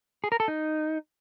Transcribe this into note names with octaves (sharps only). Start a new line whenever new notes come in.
G#4
A#4
A4
D#4